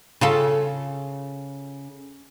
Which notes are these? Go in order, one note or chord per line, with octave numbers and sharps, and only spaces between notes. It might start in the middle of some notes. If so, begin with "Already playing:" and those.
C#3 F4 A4